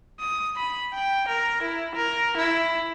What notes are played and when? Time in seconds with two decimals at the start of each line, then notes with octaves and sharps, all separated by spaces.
0.20 D#6
0.56 B5
0.93 G5
1.28 A#4
1.62 E4
1.95 A#4
2.37 E4